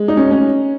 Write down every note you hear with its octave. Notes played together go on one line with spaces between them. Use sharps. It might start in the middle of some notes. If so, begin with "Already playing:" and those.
Already playing: G#3
D#4
C#4
C#4